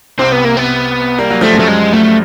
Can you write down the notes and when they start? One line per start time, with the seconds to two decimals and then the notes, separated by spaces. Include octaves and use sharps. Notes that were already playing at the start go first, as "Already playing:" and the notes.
0.19 C2 C3 C4
0.32 B3
0.45 A#3
0.57 B3
1.19 G3 A#3
1.30 F#3
1.41 F3 A3
1.53 F#2 F#3
1.60 A3
1.68 G#3
1.93 A3